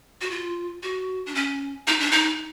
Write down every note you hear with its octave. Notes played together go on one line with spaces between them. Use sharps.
F#4
F4
F#4
D4
C#4
D#4
D4
D#4